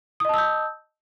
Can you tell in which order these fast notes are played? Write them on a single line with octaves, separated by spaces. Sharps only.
D#6 D#5 A5 E6 G6